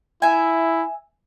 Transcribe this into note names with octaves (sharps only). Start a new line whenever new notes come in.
E4 E5 G#5